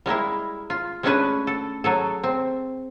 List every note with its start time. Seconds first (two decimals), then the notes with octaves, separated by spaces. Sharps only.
0.06 G3 G#3 A#3 E4
0.70 F4
1.03 G#3 A3 C#4 D4 G#4 B4
1.47 A4
1.84 F#3 G#4 A4
2.23 C4